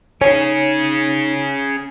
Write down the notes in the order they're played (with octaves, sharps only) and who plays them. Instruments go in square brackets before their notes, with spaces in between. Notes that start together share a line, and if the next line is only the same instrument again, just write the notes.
[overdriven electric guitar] C#4 G#4 [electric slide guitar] D#4 F5 G#5 [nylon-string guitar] C#5